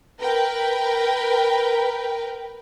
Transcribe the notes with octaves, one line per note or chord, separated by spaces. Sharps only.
A#4 B4 G5